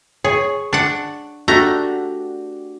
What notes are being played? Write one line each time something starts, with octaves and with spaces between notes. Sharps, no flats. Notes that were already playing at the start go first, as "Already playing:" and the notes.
G#4 C#5
D4 F#5
A3 D4 F#4 G4 A#5